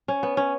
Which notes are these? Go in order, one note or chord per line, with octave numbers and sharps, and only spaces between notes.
C#4
B3
C#4